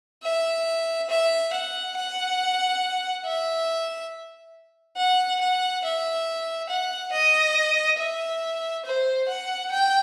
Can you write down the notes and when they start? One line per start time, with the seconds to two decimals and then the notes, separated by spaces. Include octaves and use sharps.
0.24 E5
1.09 E5
1.53 F#5
1.96 F#5
3.26 E5
4.97 F#5
5.41 F#5
5.84 E5
6.69 F#5
7.12 D#5
7.99 E5
8.85 C5
9.28 F#5
9.71 G5